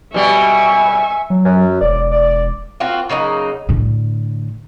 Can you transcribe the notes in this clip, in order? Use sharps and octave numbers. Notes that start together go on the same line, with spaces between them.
B2 G3 E5 G#5 C#6
F#3
F#2
E1 D5
D5
A#3 C4 F4 F#4
C#3 F#3 A#3 D#4
A2 D3